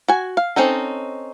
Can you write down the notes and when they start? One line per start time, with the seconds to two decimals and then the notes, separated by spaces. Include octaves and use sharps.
0.08 F#4 G#5
0.37 F5
0.56 C4 C#4 D#4 A4